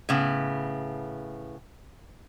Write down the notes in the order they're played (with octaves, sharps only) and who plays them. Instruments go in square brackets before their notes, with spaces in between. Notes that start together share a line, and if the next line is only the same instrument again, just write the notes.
[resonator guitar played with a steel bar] A2 C#3 B3